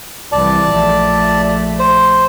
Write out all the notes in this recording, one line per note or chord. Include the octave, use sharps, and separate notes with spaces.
C2 E3 D5 A5
A#1 A3
C5